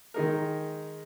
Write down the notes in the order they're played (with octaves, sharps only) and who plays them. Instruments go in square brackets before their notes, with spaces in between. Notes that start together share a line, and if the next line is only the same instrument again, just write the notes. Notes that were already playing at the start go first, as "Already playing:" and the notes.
[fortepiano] D#3 G#3 D#4 A#4